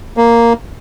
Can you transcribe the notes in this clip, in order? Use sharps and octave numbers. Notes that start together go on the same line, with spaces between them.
A#3